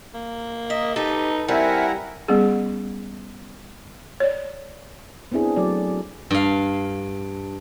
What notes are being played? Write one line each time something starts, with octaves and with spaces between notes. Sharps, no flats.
A#3
D#5 E5
D#4 G4 A4 B4
G3 C4 E4 A#4 E5 F#5 G#5
G3 B3 C#4 G#4
C#5 D5
B3 C4 D4 E4 G#4
F#3 A3 D5
G2 F5